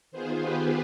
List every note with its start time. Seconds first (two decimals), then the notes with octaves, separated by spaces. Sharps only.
0.11 D#3 B3 F4 G#4 C5
0.40 G4 B4